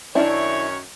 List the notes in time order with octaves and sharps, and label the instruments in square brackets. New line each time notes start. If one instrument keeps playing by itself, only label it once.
[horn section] F#2 D#3 C#5 [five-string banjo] D4 E4